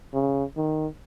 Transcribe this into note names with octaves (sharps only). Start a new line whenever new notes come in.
C#3
D#3